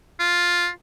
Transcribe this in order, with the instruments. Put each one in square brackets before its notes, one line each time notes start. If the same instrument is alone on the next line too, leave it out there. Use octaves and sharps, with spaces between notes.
[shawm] F4